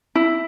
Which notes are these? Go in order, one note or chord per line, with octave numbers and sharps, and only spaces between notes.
E4